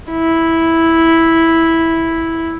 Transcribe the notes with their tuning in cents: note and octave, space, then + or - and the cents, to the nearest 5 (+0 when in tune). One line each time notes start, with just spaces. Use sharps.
E4 -5